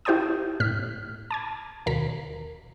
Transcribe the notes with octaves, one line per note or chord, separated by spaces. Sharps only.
E4 G4 C5 G5 A5 D#6
A2 F6 B6
A5 D6 G#6
D#2 B2 A#4 B6